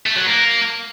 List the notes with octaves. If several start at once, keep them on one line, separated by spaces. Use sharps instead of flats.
A3
F#3
A#3